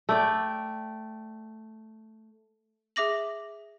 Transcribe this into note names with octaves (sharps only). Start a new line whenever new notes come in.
A3 D5 G5
G#4 E5 D6 A#6 F#7